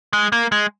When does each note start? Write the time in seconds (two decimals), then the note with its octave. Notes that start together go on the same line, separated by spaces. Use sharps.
0.13 G#3
0.32 A#3
0.52 G#3